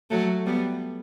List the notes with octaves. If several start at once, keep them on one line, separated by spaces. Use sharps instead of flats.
F#3 A3
G3 B3